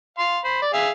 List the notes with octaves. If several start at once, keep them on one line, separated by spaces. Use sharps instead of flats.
F5 C6
C5 B5
D5
G#4 E5 F5